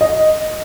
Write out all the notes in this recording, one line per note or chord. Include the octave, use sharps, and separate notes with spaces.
D#5